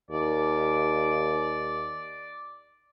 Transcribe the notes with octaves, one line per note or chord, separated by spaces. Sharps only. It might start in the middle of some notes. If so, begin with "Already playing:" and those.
D#2 D5